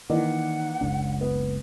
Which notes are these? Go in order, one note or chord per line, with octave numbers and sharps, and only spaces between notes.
D#3 E3 A#3 D5 F#5
F#1 C#2 D4
B3